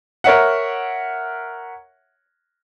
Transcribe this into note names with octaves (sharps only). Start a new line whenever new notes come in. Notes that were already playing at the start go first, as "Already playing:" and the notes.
A#4 C#5 E5 F#5